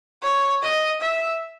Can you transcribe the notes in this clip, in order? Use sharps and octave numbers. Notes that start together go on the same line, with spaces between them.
C#5
D#5
E5